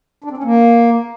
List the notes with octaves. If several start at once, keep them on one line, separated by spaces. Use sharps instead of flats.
D4
C4
C#4
A#3